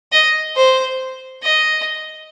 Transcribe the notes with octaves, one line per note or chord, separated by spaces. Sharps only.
D#5
C5
D#5